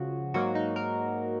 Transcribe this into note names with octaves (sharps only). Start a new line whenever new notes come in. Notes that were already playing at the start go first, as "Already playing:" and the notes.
Already playing: C#2 C#3 F3 F#4
G#2 F#3 A#3 F#4
D#4
A#4